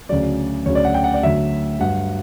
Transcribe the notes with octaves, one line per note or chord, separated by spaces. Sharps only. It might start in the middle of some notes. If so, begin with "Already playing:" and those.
D2 C#3 F#3 D5
D2 C#3 F#3 C#5
D5
F#5
G5
F#5
D5
D2 D3 F#3 E5
G2 F#3 F#5